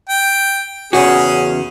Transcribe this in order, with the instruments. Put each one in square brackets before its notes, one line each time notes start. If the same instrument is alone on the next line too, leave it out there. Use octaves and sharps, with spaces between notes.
[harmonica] G5
[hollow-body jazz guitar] E2 C#3 F#4 [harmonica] C#4 G#4